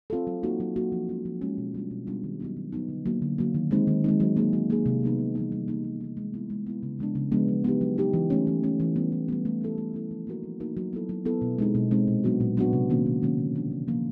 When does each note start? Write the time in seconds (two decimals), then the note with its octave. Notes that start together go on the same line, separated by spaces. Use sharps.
0.10 C4 F4 A4
0.27 F#3
0.43 A#3 D#4 F#4
0.60 F#3
0.76 A#3 D#4 F#4
0.92 F3
1.09 G#3 C#4 F4
1.25 F3
1.41 G#3 C#4 F4
1.58 B2
1.74 G3 B3 D4 F4
1.91 B2
2.07 G3 B3 D4 F4
2.24 D#3
2.40 F#3 B3 D#4
2.57 D#3
2.72 F#3 B3 D#4
2.89 D3
3.06 F#3 A#3
3.22 D3
3.38 F#3 A#3
3.55 D#3
3.71 G#3 C4 D#4
3.87 D#3
4.04 G#3 C4 D#4
4.20 F#3
4.37 A#3 D#4 G#4
4.53 F#3
4.70 A#3 D#4 G#4
4.86 C3
5.02 E3 G3 B3 D#4
5.19 C3
5.35 E3 G3 B3 D#4
5.52 G3
5.68 A#3 D#4
5.84 G3
6.01 A#3 D#4
6.17 G#3
6.34 B3 E4
6.50 G#3
6.66 B3 E4
6.83 C#3
6.99 F3 G#3 B3 D4
7.15 C#3
7.32 F3 G#3 B3 D4
7.48 F#3
7.64 B3 D#4 G4
7.81 F#3
7.98 B3 D#4 G4
8.13 E3
8.30 A3 C#4
8.47 E3
8.63 A3 C#4
8.80 E3
8.96 G3 B3
9.12 E3
9.28 G3 B3
9.45 A3
9.61 C#4 E4 A4
9.78 A3
9.94 C#4 E4 A4
10.11 F3
10.27 A#3 D#4 F#4 A#4
10.43 F3
10.60 A#3 D#4 F#4 A#4
10.77 F#3
10.93 B3 E4 A4
11.09 F#3
11.25 B3 E4 A4
11.42 B2
11.58 G#3 C4 D#4
11.75 B2
11.91 G#3 C4 D#4
12.07 A#2
12.24 F#3 B3 D4 F#4
12.40 A#2
12.57 F#3 B3 D4 F#4
12.73 C3
12.90 D#3 F#3 A#3 C#4
13.06 C3
13.22 D#3 F#3 A#3 C#4
13.38 D3
13.55 F3 A#3 D4
13.72 D3
13.88 F3 A#3 D4